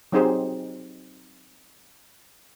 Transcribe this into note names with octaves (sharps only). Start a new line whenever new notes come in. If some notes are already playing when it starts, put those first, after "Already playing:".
F#3 C4 D#4 G4 G#4 C5